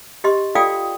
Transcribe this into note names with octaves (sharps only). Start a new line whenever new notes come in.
G4 D#5 C6
F4 A4 D5 F5 G5 D#6